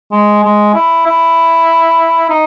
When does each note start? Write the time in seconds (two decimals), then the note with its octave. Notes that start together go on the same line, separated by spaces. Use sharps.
0.12 G#3
0.44 G#3
0.74 E4
1.06 E4
2.30 D#4